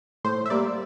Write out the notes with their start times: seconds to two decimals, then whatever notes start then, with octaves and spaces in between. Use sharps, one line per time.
0.24 A2 C5
0.46 E5
0.50 G3 A#3 D5